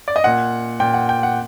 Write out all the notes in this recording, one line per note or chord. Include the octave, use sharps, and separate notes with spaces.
D5
D#5
A#2 F#5
A#2 G5
F#5
G5
F#5